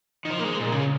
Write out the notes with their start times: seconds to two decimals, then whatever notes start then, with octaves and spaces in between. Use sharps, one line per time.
0.25 D#3
0.30 F3
0.39 A#3
0.44 G#3
0.59 A#2
0.72 C#3